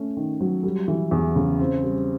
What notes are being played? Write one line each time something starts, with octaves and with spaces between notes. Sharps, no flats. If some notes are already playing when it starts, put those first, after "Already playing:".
Already playing: A3 C#4
D#3
F#3
G3
E3
E2
C#3
C4
G3